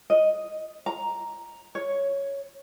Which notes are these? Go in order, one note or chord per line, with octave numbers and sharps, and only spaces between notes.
D#5
A#5
C#5